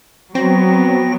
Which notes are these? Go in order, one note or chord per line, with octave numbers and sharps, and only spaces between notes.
F#3 B3 C4 F#4 G5 A#6